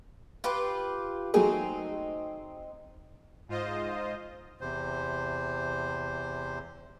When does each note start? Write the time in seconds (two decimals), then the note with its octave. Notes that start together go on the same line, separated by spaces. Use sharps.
0.44 F4 G4 B4
1.34 F#3 A3 C4 D#4 G#4
3.48 G#2 F4 C5 D#5
4.61 E2 C3 C5